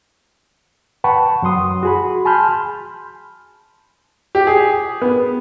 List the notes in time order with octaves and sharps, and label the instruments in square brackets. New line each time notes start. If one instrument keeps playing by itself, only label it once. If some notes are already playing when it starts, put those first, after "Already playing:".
[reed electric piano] B4 F#5 G5 A5 B5 C#6
F#2 F#3 F#5 C6 D#6
F#4 G#4 B5
G#5 A5 B5 C6 F6 G6
[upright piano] G4
G#4
B3